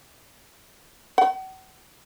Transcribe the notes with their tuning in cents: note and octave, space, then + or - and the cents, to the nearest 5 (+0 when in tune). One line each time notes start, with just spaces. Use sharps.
F#5 +40